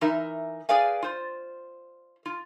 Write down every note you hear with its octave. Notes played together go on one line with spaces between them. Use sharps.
E3 D#4 A#4 E5
G#4 B4 D5 F5 G#5
F4 C5
F4